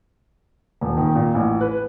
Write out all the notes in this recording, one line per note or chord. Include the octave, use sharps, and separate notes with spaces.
D#1
D#3
A#2
A1
B4